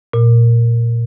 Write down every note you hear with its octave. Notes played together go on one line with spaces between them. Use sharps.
A#2